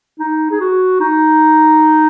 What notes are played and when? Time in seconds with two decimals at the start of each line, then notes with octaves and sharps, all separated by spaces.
0.19 D#4
0.51 G#4
0.60 F#4
1.00 D#4